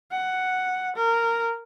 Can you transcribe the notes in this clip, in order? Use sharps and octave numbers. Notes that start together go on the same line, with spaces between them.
F#5
A#4